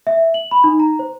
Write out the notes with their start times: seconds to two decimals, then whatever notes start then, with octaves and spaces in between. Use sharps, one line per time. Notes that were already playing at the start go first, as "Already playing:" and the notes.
0.07 E5
0.34 F#7
0.51 B5
0.64 D#4
0.80 A#5
0.99 C5